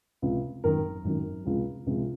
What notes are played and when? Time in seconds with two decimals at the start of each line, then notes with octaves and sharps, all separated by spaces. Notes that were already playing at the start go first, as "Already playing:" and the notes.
0.22 C#2 C3 F3
0.64 G#1 F#2 D#3 A#4
1.04 G#1 F#2 D#3
1.45 C#2 C3 F3 G#3
1.86 C#2 C3 F3 G#3